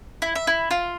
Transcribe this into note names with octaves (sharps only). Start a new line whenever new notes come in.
E4
E5
E4
F4